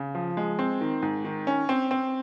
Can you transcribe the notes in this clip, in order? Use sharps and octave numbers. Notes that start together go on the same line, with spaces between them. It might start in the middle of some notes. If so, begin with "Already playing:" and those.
Already playing: C#3
F3
G#3
C4
D#3
G#2
D#3
C#4
C4
C4